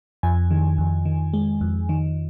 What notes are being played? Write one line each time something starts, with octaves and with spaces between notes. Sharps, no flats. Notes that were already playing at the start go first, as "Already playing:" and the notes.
F2 G#5
D#3
F2
D#3
G#3
F2
D#3